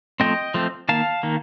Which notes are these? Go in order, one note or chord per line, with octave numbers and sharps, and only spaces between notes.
F3 A3 C4 D#5 G5
F3 A3 C4
D#3 A#3 F5 A5
D#3 A#3